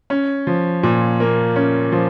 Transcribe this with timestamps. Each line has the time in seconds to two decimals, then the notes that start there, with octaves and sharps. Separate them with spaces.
0.10 C#4
0.47 F3
0.83 A#2
1.20 A#3
1.56 C#4
1.92 F3